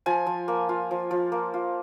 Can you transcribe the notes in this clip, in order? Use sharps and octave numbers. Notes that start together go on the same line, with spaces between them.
F3 G#5
F3
A#3
F4
F3
F3
A#3
F4